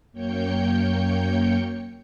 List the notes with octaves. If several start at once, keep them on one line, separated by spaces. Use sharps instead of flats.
F#2 A#3 C#5 G5 G6 C#7